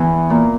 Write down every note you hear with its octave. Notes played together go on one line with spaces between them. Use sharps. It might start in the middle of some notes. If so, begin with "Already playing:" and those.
Already playing: E2 E3
A#2 A#3